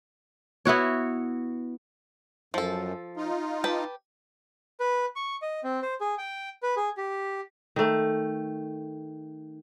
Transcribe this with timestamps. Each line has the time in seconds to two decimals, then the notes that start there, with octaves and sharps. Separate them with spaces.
0.65 B3 E4 F#4 C#5
2.54 F#2 F3 A4
3.17 D#4 F4
3.64 G4 B4 A5
4.80 B4
5.16 C#6
5.42 D#5
5.64 C4
5.82 C5
6.01 G#4
6.18 G5
6.63 B4
6.77 G#4
6.97 G4
7.76 D#3 A3